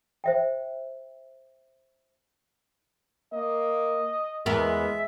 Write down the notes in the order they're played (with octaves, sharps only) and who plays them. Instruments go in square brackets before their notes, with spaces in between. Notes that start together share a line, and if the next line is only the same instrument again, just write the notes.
[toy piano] C5 E5 G5
[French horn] A#3 [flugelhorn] D#5
[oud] E2 B3 A#4 [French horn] G#3 [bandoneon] E5